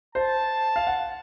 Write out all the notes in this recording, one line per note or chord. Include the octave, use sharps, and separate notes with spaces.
C5 A5
F5
F#5